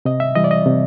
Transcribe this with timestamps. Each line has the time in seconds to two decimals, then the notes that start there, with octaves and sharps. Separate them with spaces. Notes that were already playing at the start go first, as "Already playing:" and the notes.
0.05 C3 D#5
0.20 E5
0.35 E3 G3 D#5
0.44 D5
0.51 D#5
0.66 C3